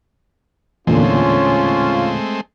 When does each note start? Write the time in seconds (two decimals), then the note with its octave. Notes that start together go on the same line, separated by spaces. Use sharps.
0.87 E2 A#2 D3 G#3 A3 C4 C#4 F4